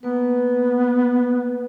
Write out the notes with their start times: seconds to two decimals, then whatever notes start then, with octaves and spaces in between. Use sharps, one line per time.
0.03 A#3 B3 B4